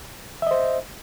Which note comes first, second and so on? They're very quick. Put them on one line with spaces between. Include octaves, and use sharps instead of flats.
E5 D#5 C5